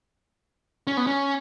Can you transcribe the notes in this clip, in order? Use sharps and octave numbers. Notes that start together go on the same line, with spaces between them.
C#4
B3
C#4